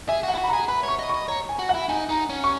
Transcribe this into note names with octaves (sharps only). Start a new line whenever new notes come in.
G#4 E5
F#4
F#5
E4
F#4
B5
A#5
G#4
B4 B5
C#5 C#6
D#5
C#6
D#5
C#5 A#5
G#5
F#4
F#5
E4
D#4 G#5
D#4 A#5
C#4
C#6